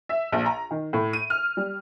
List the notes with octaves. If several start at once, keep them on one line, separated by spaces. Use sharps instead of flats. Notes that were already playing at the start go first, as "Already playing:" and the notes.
E5
A#1
A#5
D#3
A2
D#7
F6
G3